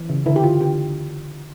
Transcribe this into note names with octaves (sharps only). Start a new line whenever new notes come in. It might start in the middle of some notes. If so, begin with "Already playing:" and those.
Already playing: E3
C#3
D3 E4
G4
D3 F4
D3 G4